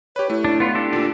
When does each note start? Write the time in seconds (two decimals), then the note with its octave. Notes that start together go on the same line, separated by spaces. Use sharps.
0.16 G4 B4 C#5
0.30 A3 E4
0.45 D4
0.60 B3 F4
0.75 D4 G4 A4
0.93 A#2 D3 F4